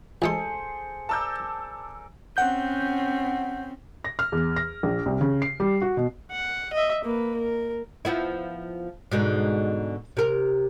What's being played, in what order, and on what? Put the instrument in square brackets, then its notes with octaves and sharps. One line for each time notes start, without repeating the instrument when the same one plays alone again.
[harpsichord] A1 G#3 C6 [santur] G#4 A4 C5 [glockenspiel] G#5 C#7
[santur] A#4 D5 [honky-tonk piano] A5 E6 G6
[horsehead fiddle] C4 C#4 [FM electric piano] F#5 G6
[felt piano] A#6
F6
E2
A#6
A#1
C2
C#3
C7
G3
F#4
B2
[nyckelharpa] F#5
D#5 E5
A#3 B4
A#4
[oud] F3 B3 E4
G#2 B2 D3
C3 A#4